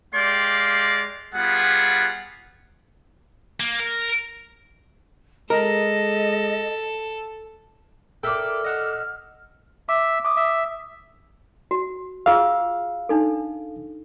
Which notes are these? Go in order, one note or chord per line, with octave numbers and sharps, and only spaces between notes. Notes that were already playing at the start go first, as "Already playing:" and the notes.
G#3 G4 D5 F5 C6
G3 B3 F4 G#4 F#5
A#3
A#4
G#3 A4 A#4 D#5
A4 A#4 D5 E5 G5 F6
D#5 F#5 E6
E5 D6
D6 D#6
E5
F#4
F4 G#4 F5 E6
D4 D#4 A4